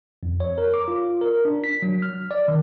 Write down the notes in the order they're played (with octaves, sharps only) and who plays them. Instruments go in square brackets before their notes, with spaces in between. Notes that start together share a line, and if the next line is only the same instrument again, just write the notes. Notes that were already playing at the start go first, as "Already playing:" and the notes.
[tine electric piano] F2
C#5
A#4
D6
F4
A#4
D4
B6
F#3
F6
D5
D#3